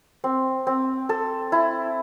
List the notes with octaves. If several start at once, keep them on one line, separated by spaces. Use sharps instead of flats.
C4
C4
A4
E4